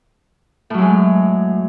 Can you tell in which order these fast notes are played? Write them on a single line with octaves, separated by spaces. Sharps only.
A2 F#3 F#2 G#3